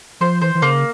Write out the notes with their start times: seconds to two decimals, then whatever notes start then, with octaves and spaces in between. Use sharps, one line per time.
0.21 F3 C5
0.41 E3 C5
0.55 E3
0.62 C#3 A#3